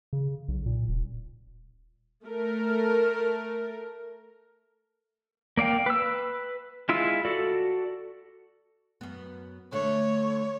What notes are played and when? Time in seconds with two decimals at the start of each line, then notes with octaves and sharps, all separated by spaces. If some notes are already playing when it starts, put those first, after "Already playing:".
0.13 C#3
0.48 B1
0.66 A#2
0.88 D#1
2.25 A3 A#4
5.57 A#3 D5 F5 G5
5.86 B4 E6
6.89 G#3 E4 F4 F5 E6
7.25 F#4 A4 D5
9.01 F#2 B3
9.73 D3 A3 C#5